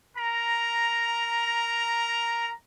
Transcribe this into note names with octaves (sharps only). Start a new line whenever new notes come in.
A#4 A#5